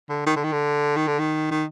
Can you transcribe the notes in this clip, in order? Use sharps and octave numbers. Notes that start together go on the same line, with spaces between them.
D3
D#3
D3
D#3
D3
D#3
D3
D#3
D#3